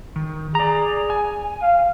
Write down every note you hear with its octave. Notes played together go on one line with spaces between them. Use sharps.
D#3
G#4 D5 A#5
G#5
F5